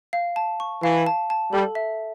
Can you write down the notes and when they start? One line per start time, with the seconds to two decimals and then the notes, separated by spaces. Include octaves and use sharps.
0.13 F5
0.36 A5
0.60 C#6
0.82 E3 F5
1.07 A5
1.30 A5
1.52 G3 A4
1.75 E5